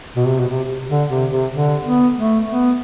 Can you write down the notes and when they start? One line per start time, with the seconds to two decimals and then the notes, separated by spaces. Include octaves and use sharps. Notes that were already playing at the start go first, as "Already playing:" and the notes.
0.16 B2
0.27 C3
0.40 B2
0.47 C3
0.90 D3
1.10 C3
1.32 C3
1.53 D3
1.85 B3
2.17 A3
2.49 B3